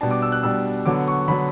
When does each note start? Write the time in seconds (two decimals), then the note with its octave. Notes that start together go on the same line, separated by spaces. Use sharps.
0.01 B2 G3 D4 A5
0.11 D6
0.22 E6
0.32 F#6
0.43 B2 G3 D4 E6
0.86 D3 F#3 B3 D6
1.08 C#6
1.28 D3 F#3 B3 B5